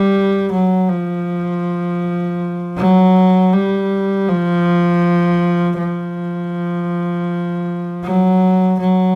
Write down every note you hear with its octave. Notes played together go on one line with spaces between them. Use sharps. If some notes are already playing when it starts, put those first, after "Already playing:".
Already playing: G3
F#3
F3
F#3
G3
F3
F3
F#3
F#3